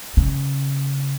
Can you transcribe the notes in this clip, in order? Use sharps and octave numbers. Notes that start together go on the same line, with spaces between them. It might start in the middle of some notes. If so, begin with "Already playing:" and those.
C#3